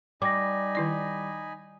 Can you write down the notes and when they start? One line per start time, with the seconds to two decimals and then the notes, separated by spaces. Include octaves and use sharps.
0.22 G3 D#4 G#5 B5 D6 A#6
0.75 D#3 E4 D5